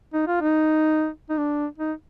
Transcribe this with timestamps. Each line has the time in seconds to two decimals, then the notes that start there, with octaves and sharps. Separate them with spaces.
0.14 D#4
0.27 F4
0.41 D#4
1.30 D#4
1.37 D4
1.78 D#4